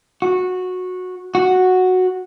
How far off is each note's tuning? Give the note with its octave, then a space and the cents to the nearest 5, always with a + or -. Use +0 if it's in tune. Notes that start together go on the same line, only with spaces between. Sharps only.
F#4 -15
F#4 -5